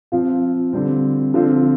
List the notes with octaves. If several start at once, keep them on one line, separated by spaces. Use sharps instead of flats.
F3 C4 F4
D3 G3 C4
D3 F3 C4 F4